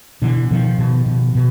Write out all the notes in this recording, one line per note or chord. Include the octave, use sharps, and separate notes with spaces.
B2 D3 E3
B2 D#3 F3
B2
B2
B2